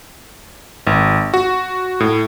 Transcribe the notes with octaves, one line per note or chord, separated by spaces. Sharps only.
G#1
F#4
A2